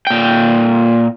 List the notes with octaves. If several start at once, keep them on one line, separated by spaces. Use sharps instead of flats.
A#2 G5